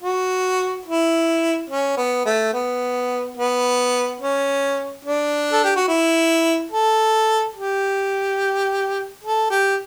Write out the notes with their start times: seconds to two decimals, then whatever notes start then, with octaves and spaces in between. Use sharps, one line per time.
0.02 F#4
0.86 E4
1.70 C#4
1.97 B3
2.25 A3
2.53 B3
3.37 B3
4.20 C#4
5.05 D4
5.52 A4
5.64 G4
5.76 F#4
5.88 E4
6.71 A4
7.55 G4
9.23 A4
9.51 G4